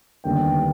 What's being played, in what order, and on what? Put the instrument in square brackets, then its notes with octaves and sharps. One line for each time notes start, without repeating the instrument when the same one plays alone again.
[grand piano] D#2 D3 G3 B3 G5